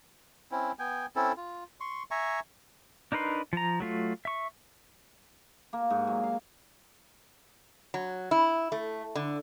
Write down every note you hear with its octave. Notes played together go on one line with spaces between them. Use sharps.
C4 C#4 E4
B3 G5 G#5
C4 C#4 E4 A4
F4
C6 C#6
E5 G#5 A#5 C#6
D4 D#4 A#4 B4 C6
F3 A#5
F#3 A3 F4
E5 C#6
A#3
G#2
F#3
F5
F#3
E4
A3
D3